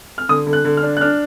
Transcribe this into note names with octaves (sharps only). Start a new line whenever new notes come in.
F6
D3 D#6
D3
F#6
D3
F6
D4
F#6
D4 F6